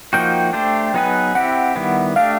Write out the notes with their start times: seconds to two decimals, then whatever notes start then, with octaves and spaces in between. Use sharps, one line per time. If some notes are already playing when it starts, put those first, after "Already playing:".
0.13 F3 A#3 D#4 F#4 G5
0.53 A3 D4 G4 C5
0.94 F#3 B3 D#4 G#4 B4
1.35 C4 E4 G4 F#5
1.76 D#3 G3 B3 E4
2.16 A3 D4 G4 F5